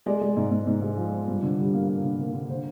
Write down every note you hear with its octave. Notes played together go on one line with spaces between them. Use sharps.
G#3 D5
G#3
G#2
G#2
G#2
G#3
F3
F3
G2
D3
G3
A#3
A#3
D3
A#3
D3
C5